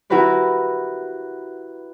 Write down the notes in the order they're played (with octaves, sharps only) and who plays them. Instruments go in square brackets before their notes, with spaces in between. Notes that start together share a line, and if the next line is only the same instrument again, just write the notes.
[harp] E4 F#4 G4 A#4 B4 D5